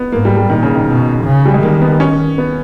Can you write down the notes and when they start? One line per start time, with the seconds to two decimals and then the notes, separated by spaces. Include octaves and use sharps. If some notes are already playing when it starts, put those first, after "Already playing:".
Already playing: B3
0.12 G#2 A#3
0.25 G3
0.37 G3
0.50 A#2 D#3
0.63 C#3
0.75 D#3
0.87 B2
1.25 C#3
1.45 G3
1.54 G#3
1.63 D#3 A#3
1.82 B3
2.00 C#4
2.38 B3